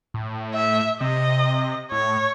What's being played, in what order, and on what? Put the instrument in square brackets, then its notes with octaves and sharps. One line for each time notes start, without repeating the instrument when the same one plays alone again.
[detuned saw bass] A2
[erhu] E5
[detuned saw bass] C3 [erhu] D#5
[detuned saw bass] A2 [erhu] C#5